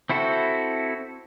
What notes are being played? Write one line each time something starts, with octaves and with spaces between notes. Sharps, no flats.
C4 E4 F#4 A4